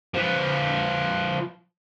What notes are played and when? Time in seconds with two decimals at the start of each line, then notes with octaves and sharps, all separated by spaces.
0.15 F3 B4